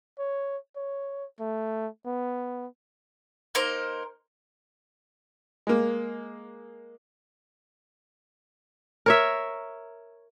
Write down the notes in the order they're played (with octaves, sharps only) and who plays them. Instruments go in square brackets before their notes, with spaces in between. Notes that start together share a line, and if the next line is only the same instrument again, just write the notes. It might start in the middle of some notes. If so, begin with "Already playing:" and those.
[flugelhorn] C#5
C#5
A3
B3
[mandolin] A#3 D#4 A#4 C5
[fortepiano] G#3 A#3
[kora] A#4 C#5 E5